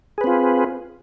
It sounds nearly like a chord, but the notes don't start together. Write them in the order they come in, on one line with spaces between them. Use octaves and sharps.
G#4 B4 C4 F4